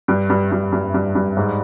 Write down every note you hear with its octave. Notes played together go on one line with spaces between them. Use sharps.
G2
G2
G2
G2
G2
G2
G#2